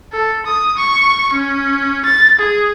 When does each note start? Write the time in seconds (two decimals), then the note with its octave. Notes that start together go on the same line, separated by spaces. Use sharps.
0.12 A4
0.46 D#6
0.77 C#6
1.34 C#4
2.05 A6
2.39 G#4